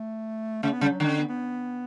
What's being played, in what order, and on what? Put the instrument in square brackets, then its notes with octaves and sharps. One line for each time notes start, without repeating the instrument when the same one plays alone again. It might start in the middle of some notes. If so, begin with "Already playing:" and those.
Already playing: [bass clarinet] A3
[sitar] C#3 [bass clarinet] A3
[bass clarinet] B3
[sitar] C#3 [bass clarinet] G3
[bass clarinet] F#3
[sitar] D3 [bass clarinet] G3
[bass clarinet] D4
C#4
B3
B3